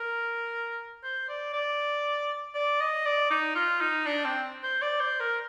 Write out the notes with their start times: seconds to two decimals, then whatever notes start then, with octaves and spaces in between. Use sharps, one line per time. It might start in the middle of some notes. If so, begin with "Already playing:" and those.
Already playing: A#4
1.03 C5
1.29 D5
1.53 D5
2.54 D5
2.80 D#5
3.06 D5
3.30 D#4
3.55 F4
3.81 D#4
4.06 D4
4.24 C4
4.63 C5
4.82 D5
5.00 C5
5.20 A#4